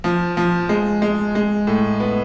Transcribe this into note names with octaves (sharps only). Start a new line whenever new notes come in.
F3
F3
G#3
G#3
G#3
A2
B3